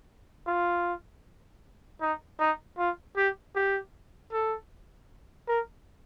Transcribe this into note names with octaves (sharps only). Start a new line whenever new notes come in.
F4
D#4
D#4
F4
G4
G4
A4
A#4